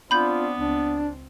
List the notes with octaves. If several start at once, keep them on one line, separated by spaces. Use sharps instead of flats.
B3 C4 D4 F4 B5 G6
C#2 C4 D4